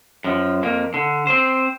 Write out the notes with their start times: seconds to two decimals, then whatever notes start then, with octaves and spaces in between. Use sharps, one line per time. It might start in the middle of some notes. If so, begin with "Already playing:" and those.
0.24 F#2 F3
0.63 F2 A#3
0.94 D3
1.27 C4 C5